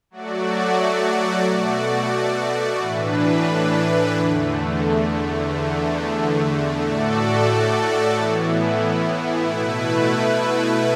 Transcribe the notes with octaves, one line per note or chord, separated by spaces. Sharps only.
F#3 A3 F#4 D5
B2 A3 F#4 D5
A2 E3 D4 B4
E2 D3 A3
E2 D3 A3
A2 A3 F#4 A4 D5
A2 E3 B3 E4
B2 A3 E4 B4